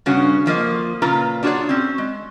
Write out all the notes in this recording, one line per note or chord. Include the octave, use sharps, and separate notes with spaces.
G2 C#3 B3 C#4 F#4
F2 F3 A#3 D#5
A#2 C#3 F4 B4 A#5
D4 F4 F#4 G#4 C#5 D5
C4 C#4
G#3